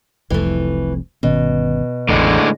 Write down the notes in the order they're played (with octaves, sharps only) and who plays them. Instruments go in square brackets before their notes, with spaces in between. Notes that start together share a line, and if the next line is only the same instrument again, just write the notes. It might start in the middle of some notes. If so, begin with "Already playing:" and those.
[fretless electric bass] F1 C2 F2 [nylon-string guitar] E3 A3
[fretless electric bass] G1 D#3 C#4 [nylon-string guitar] B2
[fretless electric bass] A1 E2 [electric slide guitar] A2 D3 G#3